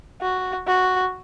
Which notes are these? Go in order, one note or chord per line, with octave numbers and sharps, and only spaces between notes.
F#4
F#4